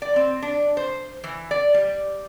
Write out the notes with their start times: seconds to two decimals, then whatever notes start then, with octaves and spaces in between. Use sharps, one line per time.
0.02 D5
0.16 C4
0.42 D4
0.77 C5
1.24 E3
1.51 D5
1.74 G3